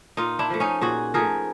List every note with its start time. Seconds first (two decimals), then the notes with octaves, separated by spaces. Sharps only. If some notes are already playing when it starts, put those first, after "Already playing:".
0.17 A#2 D#4 F4
0.39 D4 E4
0.50 F3 A3
0.60 C#4 D#4
0.81 A#2 F#4 G#4
1.14 F3 A3 G#4 A#4